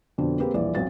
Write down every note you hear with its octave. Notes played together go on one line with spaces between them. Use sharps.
F2 B2 D3 D4
A#3 C4 G4 G#4 B4
D#1 A#1 E3 D5
B1 C4 F#4 A6